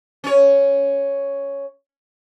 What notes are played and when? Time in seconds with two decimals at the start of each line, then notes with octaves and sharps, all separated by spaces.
0.24 C#4 C#5